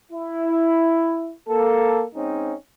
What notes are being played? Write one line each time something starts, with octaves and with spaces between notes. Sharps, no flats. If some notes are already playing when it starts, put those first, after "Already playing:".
E4
A#3 A4
G#2 C4 C#4 D#4